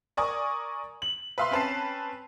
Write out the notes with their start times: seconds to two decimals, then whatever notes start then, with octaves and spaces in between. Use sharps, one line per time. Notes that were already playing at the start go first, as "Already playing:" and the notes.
0.17 A#4 D5 G#5 C#6 D#6
1.02 F#7
1.38 B4 E5 F5 B5 C6
1.51 C4 C#4 B4 A5 C7